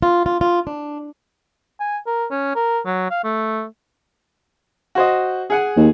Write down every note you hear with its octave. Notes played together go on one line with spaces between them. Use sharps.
F4
F4
F4
D4
G#5
A#4
C#4
A#4
F#3
F5
A3
F#4 C5 D#5
G#4 F#5 G#5
D#2